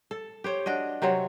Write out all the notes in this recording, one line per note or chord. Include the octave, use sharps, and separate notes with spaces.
A4
G4 C5 C#5
D4 F#4 D#5
C3 F#3 C4 C#5